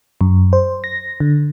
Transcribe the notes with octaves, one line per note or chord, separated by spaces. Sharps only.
F#2
C5
A#6
D3